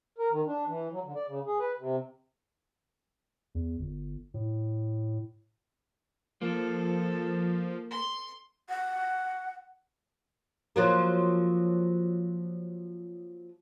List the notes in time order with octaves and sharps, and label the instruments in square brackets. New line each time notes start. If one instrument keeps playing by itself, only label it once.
[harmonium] A#4
D#3
D4
E3
F#3
D3
D5
C#3
G#4
B4
C3
[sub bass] E2
G1
A2
[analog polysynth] F3 [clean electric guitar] A#3 [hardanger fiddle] A4
[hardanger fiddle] C6
[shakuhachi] F#5
[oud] F3 F#3 A#3